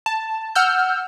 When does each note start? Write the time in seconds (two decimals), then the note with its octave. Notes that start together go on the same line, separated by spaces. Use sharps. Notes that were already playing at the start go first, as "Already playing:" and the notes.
0.06 A5
0.55 F#5 E6 F6 G6